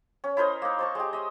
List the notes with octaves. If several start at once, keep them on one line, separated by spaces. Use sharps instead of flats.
C#4
E4 A#4 C5 D#5
A#3 D#4
C5 A5 C#6
G#3 G4
D#5 E5